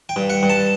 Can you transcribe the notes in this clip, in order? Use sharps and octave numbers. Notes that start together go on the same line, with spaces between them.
G5
G2
F#5
G2
A5